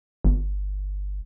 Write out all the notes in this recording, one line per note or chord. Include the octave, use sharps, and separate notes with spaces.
G1